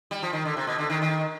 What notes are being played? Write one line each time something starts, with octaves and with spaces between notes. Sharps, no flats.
G3
F3
D#3
D3
C3
B2
D3
D#3
D#3